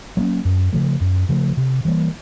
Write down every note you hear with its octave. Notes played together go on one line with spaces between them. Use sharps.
F#3 A#3 C#4
F#2
C#3 F3 A3
F#2
C#3 F3 A3
C3
E3 G3 A#3